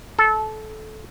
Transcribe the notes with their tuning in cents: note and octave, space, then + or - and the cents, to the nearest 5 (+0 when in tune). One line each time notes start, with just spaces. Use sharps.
A4 -20